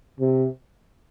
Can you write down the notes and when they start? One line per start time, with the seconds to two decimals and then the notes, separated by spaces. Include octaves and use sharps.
0.19 C3